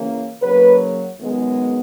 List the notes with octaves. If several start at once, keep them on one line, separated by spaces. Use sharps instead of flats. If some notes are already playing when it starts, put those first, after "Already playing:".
Already playing: C#3 E3 A#3 C#4
C#3 F#3 A#3 B4
F#2 D#3 G#3 B3